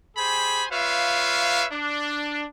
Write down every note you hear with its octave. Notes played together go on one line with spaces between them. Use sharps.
G4 G#4 C5 G#5 B5
F4 B4 C#5 E5 F5
D4